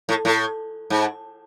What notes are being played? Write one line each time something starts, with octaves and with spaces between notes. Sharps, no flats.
A2
A2
G#2